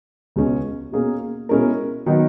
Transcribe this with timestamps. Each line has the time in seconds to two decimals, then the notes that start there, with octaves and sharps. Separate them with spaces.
0.36 C#2 B2 G#3 C#4
0.92 B2 A#3 C#4 G#4
1.49 B2 G#3 C#4 E4 A#4
2.06 D#3 F#3 B3 D#4